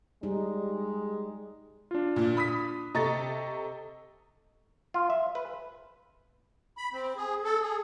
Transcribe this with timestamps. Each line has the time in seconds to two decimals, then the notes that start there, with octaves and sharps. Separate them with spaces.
0.23 G3 G#3 D#4
1.91 D4 F4
2.16 A#2
2.37 B5 D#6 B6
2.95 C3 A4 D#5 A#5 C#6 A6
4.94 F4
5.10 E5
5.35 B4
6.77 B5
6.93 C4
7.17 G#4
7.44 A4
7.61 G#4